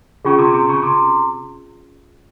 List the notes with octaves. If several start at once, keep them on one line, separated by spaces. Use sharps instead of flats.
C#3 C#4 F4 G#4
C3
C3
C#3
C3